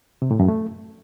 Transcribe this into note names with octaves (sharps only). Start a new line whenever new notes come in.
C3
A2
F#2
A3